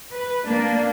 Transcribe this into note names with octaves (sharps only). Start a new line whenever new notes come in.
B4
A#3 D4